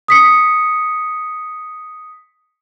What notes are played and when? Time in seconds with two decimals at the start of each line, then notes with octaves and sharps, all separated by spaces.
0.08 D#6 B6 C#7